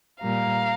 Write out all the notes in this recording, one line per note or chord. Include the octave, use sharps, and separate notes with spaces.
A#2 G3 A#3 F5 A#5